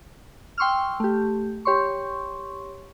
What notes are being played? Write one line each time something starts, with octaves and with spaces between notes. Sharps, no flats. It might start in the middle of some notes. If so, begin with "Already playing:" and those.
G5 C6 C#6 E6 F6
A3 G4
G4 C#5 C6 C#6